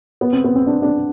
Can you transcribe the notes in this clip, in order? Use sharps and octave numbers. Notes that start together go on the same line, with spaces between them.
B3
C4
B3
C4
D4
D4